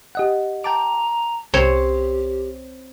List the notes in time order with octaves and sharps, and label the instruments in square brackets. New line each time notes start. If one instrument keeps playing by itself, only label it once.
[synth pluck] G4 D#5 F#5
[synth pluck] G5 A5 D6 [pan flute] A#5
[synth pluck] C2 [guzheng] C4 C#5 [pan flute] G4